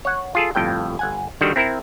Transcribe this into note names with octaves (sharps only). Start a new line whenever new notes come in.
C#5 F#5
F4 G#4 A4
G1 F2 A2 G5
G1 F#5 G#5
D3 D#3 G3 F#4
C4 E4 A#4